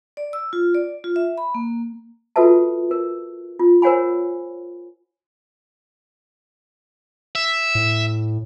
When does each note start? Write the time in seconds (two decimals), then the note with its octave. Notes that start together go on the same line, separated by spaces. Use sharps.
0.17 D5
0.33 E6
0.53 F4
0.74 D5
1.04 F4
1.16 E5
1.38 B5
1.55 A#3
2.36 F4 F#4 A4 B4 E5 A5
2.91 A#4
3.59 F4
3.82 A#4 C5 C#5 F#5 G#5 B5
7.35 E5
7.75 A2